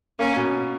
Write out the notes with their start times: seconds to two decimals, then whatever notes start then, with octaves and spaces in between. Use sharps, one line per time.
0.19 A#3 C#4
0.36 B2